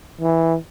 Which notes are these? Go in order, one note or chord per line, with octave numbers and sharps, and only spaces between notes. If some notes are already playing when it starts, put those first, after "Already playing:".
E3